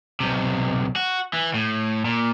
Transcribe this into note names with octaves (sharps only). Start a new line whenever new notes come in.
B1 C3
F#4
E3
A2
A#2